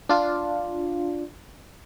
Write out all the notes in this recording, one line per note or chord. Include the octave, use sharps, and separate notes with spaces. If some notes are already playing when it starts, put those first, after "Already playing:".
D4 F4